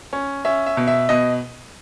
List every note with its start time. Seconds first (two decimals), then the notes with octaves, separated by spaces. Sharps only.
0.13 C#4
0.45 C#4 E5
0.66 E5
0.77 B2
0.88 E5
1.09 B2 D#5